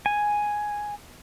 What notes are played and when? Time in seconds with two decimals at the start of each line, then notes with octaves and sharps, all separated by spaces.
0.06 G#5